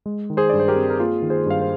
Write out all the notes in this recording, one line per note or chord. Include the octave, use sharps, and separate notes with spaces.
G#3
D#3
G#4 C5
G2 D5
C5
G4 A#4
C4
A#4
A#3 F4 G#4
D#3
G#4 C5
G2 F5
C5